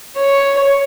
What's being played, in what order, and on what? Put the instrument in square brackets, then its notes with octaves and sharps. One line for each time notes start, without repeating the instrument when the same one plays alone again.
[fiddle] C#5